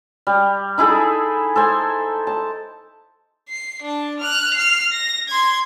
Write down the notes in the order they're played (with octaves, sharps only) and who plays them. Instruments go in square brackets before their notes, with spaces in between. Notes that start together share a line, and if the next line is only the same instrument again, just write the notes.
[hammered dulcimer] G3
D#4 E4 G#4 A4
A4 C5 G#5
A5
[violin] C7
D4 A5
F6 F#6
F6 C7
A#6
C6 G#6